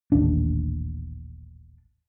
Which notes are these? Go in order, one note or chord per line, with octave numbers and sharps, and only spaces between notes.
D#1 A1 D#2 D4